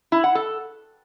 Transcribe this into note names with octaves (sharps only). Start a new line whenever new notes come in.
E4
F#5
A4